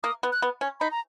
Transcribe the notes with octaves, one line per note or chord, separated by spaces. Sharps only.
A#3 D#6
B3
F#6
B3
C#4
D#4 B5
A#5